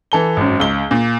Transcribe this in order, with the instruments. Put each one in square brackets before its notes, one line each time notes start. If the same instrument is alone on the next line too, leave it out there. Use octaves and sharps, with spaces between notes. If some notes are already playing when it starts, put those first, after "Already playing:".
[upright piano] E3 A4 G7
G#1 F#2
C#2 G7
A#2